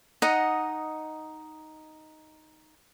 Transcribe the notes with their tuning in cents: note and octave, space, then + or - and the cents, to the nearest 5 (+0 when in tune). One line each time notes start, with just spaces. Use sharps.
D#4 +0 D#5 +0 F#5 +0